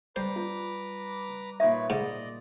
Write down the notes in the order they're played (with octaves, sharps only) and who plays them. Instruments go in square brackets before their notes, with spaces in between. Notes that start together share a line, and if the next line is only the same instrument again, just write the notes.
[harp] G3 [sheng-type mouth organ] B4 A#5 D6 [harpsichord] C5
[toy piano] F4
[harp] A#2 D#4 [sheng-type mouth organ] B4 C#5 [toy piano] E5
[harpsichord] G#2 [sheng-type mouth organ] D5 D#5